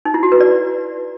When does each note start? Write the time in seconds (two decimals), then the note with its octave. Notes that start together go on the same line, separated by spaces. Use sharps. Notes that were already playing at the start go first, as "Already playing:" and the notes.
0.05 D#4
0.14 E4
0.23 F#4
0.32 B4
0.40 D5